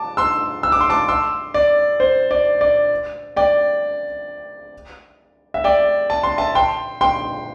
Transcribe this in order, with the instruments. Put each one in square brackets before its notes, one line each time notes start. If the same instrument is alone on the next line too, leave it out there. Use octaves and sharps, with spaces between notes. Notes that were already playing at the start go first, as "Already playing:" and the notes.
Already playing: [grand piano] A5 D6
C6 E6
E6
D6
C6
A5 D6
C6 E6
D5
C5
D5
D5
D5 G5
E5
D5 G5
A5
C6
E5 A5
G5 C6
G5 C6